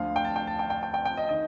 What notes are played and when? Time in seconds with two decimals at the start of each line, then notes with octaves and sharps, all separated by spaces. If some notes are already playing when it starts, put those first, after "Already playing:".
Already playing: D2 D3 F3 F5
0.16 G5
0.25 A5
0.36 G5
0.47 A5
0.59 G5
0.70 G5
0.83 G5
0.94 G5
1.05 G5
1.17 D#5
1.29 D#3 D#5